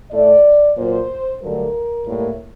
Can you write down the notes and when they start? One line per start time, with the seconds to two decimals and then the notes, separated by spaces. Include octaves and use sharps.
0.10 A2 A3 D5
0.76 A#2 F#3 A#3 C5
1.41 G2 D3 F#3 A3 A#4
2.06 A2 G3 A#3